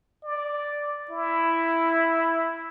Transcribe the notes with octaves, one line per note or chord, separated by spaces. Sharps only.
D5
E4